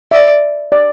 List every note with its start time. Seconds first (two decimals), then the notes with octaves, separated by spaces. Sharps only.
0.11 D5 E5
0.72 D5